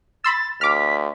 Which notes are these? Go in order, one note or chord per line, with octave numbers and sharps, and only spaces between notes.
B5 C6 E6 A6
D2 D6 F6 B6